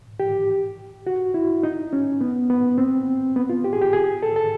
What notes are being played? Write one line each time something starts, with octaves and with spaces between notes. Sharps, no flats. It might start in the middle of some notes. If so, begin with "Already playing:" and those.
G4
F#4
E4
D#4
C#4
B3
B3
C4
B3
F4
G4
G#4
G4
G#4
A4
A4